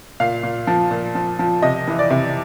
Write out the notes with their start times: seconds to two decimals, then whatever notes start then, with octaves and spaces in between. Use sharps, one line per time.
0.20 A#2 F5
0.43 A#2
0.67 F3
0.91 A#2
1.15 F3
1.39 F3
1.62 C3 D#5
1.87 E3
1.99 D5
2.10 C3